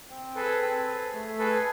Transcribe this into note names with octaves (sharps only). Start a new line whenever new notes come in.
C4
G#4 A4 B4
C4
G#4
A3
G#4 A4 B4